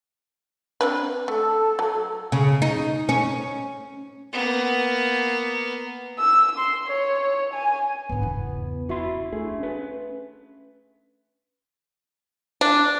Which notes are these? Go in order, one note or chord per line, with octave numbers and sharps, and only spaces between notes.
C4 D4 B4
A3 A4
F#3
C#3
D#4
C#4
A#3 B3
E6
C6
C#5
G#5
G#1 D3 B3
E2 C#3
C#4 E4 F#4 E5 C6
A3 D4 G#4
C#4 B4
D4